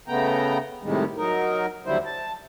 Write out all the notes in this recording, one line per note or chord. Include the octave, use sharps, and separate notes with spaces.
C#3 A3 B3 G5 A#5
A2 C3 D#3 G3 G#3
F#3 D#4 A#4
D#2 D3 F#3 G3 E4 C5
A5